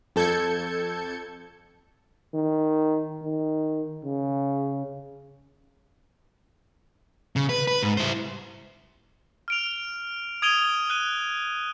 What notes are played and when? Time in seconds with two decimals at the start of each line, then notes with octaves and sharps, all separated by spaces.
0.16 F2 A4 G6 G#6 C#7
2.34 D#3
3.23 D#3
4.04 C#3
7.36 C#3
7.49 B4
7.68 B4
7.83 G#2
7.97 E4 C5
9.48 F6 D7 F7
10.42 D#6 G#6 D7 D#7 F7 G7
10.90 F#6 D#7